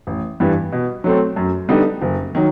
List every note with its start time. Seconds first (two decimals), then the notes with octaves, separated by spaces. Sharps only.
0.07 A1
0.40 G2 E3 G3
0.72 B2
1.04 F#3 A3 C4
1.36 F#2
1.69 D3 G3 B3 D#4
2.02 F#1
2.35 D#3 F#3